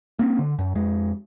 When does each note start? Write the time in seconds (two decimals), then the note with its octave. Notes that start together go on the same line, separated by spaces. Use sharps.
0.19 A#3 C4 C#4
0.39 D3
0.59 F#2
0.75 F2 G#3